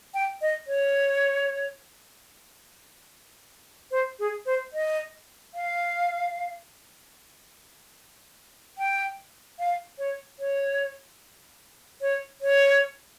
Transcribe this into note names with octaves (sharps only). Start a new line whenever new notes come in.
G5
D#5
C#5
C5
G#4
C5
D#5
F5
G5
F5
C#5
C#5
C#5
C#5